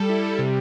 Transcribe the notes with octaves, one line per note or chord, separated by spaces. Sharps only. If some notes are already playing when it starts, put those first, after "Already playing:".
Already playing: G3 A4
E4
G3
C3